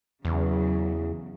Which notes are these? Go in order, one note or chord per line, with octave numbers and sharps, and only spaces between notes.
E2 C#3 F#3